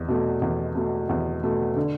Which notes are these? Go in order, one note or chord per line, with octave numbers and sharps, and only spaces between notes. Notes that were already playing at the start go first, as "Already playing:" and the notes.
Already playing: E2
B2 A3
E2
B2 A3
E2
B2 A3
D3